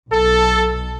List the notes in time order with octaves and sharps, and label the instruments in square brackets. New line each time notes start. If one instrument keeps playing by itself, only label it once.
[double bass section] B1 [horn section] A4